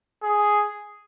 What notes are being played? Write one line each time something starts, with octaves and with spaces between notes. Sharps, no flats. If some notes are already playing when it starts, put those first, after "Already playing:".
G#4